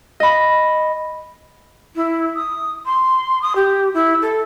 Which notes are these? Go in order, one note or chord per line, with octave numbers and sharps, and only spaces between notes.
D#5 B5
E4
D#6
C6
D#6
G4
E4
A4